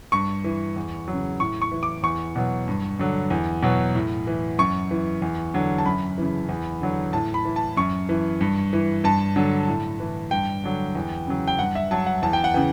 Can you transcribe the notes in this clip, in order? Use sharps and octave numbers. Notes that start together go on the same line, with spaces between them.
G2 C#6
E3
E2
C#3 F#3
A2 C#6
C#6
E3
D6
E2 C#6
B2 F#3
G2
D3 F#3
E2
B2 F#3
A2
E3
F#2 C#6
E3
E2
D3 F#3
A5
F#2 B5
C#3 E3
E2
D3 F#3
A2 A5
B5
E3
A5
F#2 C#6
E3
G2
E3
G2 A5
D3 F#3
A2
E3
G2 G5
D3 F#3
E2
C#3 F#3
G5
G2 F#5
E5
F#3 A5
F#5
E2 A5
G5
F#5
C#3 E3 G5